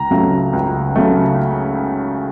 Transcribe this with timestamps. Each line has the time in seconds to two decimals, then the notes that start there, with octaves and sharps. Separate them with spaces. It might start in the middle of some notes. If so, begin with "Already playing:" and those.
Already playing: C#2 A#5
0.11 C#3 F#3 A3
0.53 C#2
0.96 C#3 F#3 A3